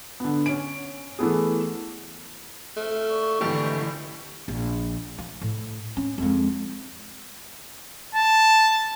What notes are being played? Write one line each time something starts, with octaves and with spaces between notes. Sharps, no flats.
D3 B3
C#4 D7
E3 A3 B3 G#4
F2 A3 F6
A#3 D5 C#6
G#1 D3 E3 A3 G4
A#1
F3
A2
C#4
F2 G#3
A5